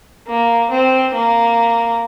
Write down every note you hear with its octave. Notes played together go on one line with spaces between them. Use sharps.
A#3
C4
A#3